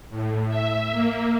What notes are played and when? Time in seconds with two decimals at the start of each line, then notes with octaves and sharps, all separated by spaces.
0.10 A2
0.48 E5
0.92 A#3